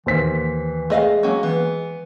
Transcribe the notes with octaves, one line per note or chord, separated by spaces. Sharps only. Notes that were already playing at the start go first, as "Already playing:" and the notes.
D#2 E3 C5 B6
G#3 A3 D#5 F5
F#3 A#3 C#4
E3 B3